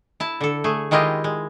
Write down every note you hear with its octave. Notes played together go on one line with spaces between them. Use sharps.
E4 A5
D3 A4
A3 G#4
D#3 G#3 E4 F4 G4 D#5
G#3